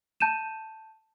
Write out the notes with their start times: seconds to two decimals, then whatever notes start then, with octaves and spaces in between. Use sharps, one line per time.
0.20 A5 G6 D#7 E7